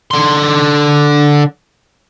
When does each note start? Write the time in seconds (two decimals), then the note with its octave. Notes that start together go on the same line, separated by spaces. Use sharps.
0.11 D3 C6